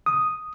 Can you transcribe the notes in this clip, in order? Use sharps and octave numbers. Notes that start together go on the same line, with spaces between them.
D#6